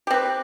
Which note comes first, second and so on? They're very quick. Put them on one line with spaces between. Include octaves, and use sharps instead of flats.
G4 C4 B4